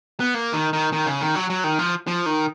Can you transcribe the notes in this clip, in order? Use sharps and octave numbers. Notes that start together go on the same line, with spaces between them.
B3
A#3
D#3
D#3
D#3
C#3
D#3
F#3
F#3
D#3
F3
F3
D#3